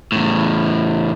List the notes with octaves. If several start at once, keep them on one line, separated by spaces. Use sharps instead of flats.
E2 A2